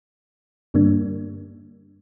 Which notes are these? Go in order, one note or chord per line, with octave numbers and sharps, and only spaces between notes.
G2 D3 G3 A#3 D4